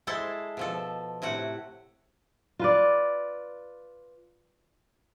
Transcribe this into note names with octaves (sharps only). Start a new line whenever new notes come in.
G#3 E4 A4 C5 A5
B2 F3 A4
A2 C3 F#4 F#5
F4 B4 D5